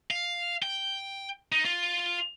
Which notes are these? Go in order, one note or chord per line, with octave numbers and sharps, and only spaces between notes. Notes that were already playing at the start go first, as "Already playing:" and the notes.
F5
G5
D#4
F4